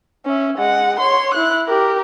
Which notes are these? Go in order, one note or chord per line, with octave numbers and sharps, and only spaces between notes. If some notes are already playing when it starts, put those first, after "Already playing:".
C#4 E5
G#3 F#5
C#5 C6
E4 F#6
G4 A#4